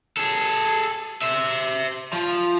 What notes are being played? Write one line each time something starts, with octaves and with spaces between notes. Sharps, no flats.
G#4 A4
C5 E5
F3